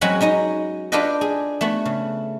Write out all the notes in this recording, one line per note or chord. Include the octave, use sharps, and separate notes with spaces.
F#3 G#3 C4 C#4 F#4 B5
C#4 D#4 D#5 A#5
D4 F4 G4 A4 B4 D#5
G#4
A3 B3 F#4
C#3